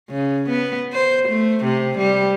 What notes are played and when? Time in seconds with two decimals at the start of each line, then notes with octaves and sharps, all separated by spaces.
0.10 C#3
0.50 B3
0.93 C5
1.29 A3
1.64 C3
1.98 G3